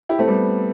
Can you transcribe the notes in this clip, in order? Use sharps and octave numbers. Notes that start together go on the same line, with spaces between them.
E4 G4
A3 C4
G3 B3